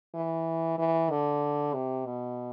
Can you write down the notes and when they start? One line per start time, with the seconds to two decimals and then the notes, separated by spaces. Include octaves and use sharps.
0.14 E3
0.78 E3
1.10 D3
1.74 C3
2.06 B2